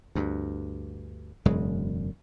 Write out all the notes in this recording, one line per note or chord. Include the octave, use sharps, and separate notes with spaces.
D2 G2
E1 F#2 C#3 G#3